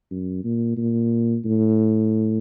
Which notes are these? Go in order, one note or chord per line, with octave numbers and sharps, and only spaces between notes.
F#2
A#2
A#2
A2